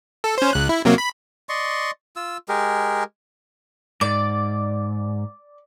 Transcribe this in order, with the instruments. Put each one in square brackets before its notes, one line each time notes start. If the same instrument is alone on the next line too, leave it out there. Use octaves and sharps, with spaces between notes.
[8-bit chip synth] A4
C#4 C5
C#2 F#6
E4
C3 F#3 A#3
B5
[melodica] D5 D#5 C6 C#6
F4 E6
G#3 G4 G#4 A#4
[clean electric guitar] G#2 [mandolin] D5